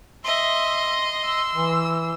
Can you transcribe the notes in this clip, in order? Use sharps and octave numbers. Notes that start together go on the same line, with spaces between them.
D#5 E5 C6
E6
E3